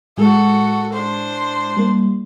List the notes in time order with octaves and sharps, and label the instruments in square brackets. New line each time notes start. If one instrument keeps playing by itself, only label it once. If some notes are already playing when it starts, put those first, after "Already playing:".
[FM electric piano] A2 G#3 [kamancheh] F#4 A4
[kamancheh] D4 C5
[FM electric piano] G3 A#3